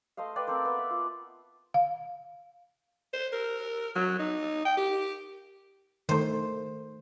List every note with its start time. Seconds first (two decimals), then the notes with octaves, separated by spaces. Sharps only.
0.17 A3 C5 D#5 F5
0.36 B4 D5 G5
0.47 C4 A4 A#4 C5
0.65 B3
0.79 E5
0.90 F4
1.74 F5
3.13 C5
3.33 A#4
3.96 F#3
4.19 D#4
4.65 G5
4.77 G4
6.09 D#3 A3 C5